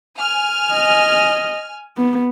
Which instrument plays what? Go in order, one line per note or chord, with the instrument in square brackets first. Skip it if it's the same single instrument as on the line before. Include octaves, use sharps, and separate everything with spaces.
[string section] G#5 F6
[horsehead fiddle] D#5
B3